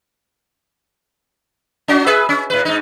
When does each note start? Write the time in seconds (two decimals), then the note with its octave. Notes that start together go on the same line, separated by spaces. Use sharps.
1.88 C#4 F#4
2.06 G#4 B4 E5
2.29 C#4
2.50 A2 B4
2.65 G#2 D#4